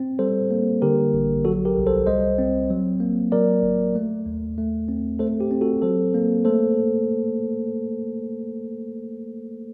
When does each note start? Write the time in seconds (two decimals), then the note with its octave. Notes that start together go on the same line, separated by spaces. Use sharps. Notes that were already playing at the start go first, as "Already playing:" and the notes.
Already playing: C4
0.19 G3 A4 C5
0.51 A#3
0.82 D3 G4 A#4
1.14 A1
1.45 F#3 F#4 A4
1.65 G4 A#4
1.76 C2
1.87 A4 C5
2.07 G3 C5 D#5
2.38 C4
2.70 F#3
3.00 A#3
3.32 F#3 A#4 D5
3.63 G1
3.95 A3
4.26 D#2
4.58 A3
4.88 C4
5.19 A3 A4 C5
5.40 G4
5.51 C4
5.61 F#4 A4
5.82 F#3 A4 C5
6.14 A#3
6.45 A3 A4 C5